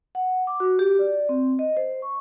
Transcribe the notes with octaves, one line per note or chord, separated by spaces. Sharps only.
F#5
D6
F#4
G4
D5
C4
D#5
C5
C#6